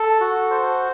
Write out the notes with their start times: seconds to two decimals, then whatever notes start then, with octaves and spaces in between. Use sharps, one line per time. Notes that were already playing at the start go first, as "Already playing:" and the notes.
Already playing: A4
0.21 F#4
0.51 C5